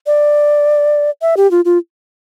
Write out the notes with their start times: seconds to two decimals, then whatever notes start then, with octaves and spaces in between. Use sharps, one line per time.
0.07 D5
1.22 E5
1.37 G4
1.51 F4
1.65 F4